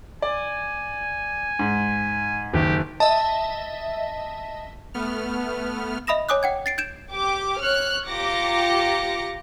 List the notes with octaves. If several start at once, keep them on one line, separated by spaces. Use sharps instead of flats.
D5 G#5
G#2
F#1 D#3 G4
D#5 E5 A5
A3 B3 F6
D#5 E5 B5 D#6 A#6 E7
C#5 G#5 D6 D#6 F#6
F#5 G5 G#6
A6 C7 D7
G6 G#6 D7 E7
G4 D6
C#5 F6 F#6
F4 G4 A#5 D6 A#6 C#7